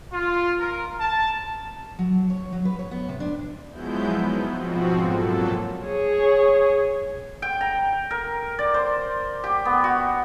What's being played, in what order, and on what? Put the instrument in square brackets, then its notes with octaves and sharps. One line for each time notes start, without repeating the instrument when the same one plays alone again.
[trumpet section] F4
A#4
A5
[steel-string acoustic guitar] F#3
C#5
F#3
B4
C#5
B3
C3
D4
[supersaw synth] F3 F#3 G#3 B3 E4 G6
B3 D#4
G#2 B2 F3 C4 F#4
A#2 F#3 A4
[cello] G#4 C#5
[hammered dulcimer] G5
A#5
A#4
D5
C5
G4
B3
F#4